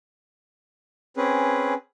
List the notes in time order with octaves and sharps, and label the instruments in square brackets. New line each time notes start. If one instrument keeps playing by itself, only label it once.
[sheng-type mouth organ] C4 C#4 G#4 B4